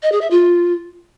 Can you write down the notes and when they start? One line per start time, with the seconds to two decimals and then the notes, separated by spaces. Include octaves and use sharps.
0.03 D#5
0.12 G#4
0.21 E5
0.31 F4